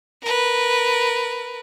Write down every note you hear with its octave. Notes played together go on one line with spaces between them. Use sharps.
A#4 B4